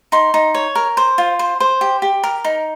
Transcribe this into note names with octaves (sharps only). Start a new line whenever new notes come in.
D#4 C6
D#4
C#5
A#4
C5
F4
C5
C5
G4
G4
A#4
D#4